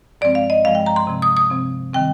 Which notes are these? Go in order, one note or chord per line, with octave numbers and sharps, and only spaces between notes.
G2 F3 G#3 C4 D5
F5
D#5
G2 F3 G#3 C4 F5
G5
A#5
C6
C3 F3 C4
D#6
D#6
C3 F3 C4
D#3 G3 C4 G5